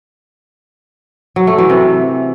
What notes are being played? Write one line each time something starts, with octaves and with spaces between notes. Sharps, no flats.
F#3
A3
E3
C3